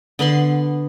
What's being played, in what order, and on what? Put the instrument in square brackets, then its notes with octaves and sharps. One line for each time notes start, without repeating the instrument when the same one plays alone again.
[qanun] D3 B3 B5 C6